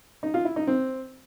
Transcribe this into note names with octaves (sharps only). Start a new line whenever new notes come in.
D#4
F4
E4
D#4
C4